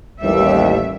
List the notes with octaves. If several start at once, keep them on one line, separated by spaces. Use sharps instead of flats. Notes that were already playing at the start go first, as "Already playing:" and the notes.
A1 D#2 G3 E5